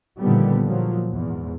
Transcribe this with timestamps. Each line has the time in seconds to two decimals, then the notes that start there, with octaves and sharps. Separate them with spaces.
0.19 A#2 D3 D#3 F3 G3 B3
0.67 A#2 F3 F#3
1.12 E2 G#2